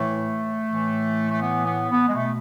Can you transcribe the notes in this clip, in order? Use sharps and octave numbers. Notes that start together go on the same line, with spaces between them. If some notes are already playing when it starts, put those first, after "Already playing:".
Already playing: A2 E3 A3
A2 E3
A3
B3
B3
B3
G#3
B2 A3